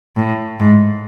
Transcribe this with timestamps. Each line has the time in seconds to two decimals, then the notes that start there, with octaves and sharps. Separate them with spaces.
0.16 A2
0.59 G#2